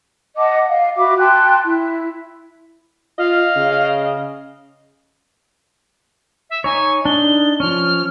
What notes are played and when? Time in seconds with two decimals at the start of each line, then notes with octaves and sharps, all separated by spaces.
0.36 D#5 F#5 A5 D6
0.67 F5
0.97 F#4 E5 B5 D6
1.17 G5 A5 C6 F#6
1.64 E4
3.18 F4 D#5 F5
3.56 C#3
6.50 E5
6.64 D#4 C#5 G#5
7.05 D4 D#4 G7
7.60 F3 C#4 F6